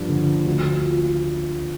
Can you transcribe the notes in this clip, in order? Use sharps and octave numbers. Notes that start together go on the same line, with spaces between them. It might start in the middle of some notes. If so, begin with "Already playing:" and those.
Already playing: G2 F3
D3
D2
F4